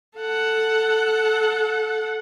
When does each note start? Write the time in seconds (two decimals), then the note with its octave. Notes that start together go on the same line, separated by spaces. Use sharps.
0.16 A4 F#5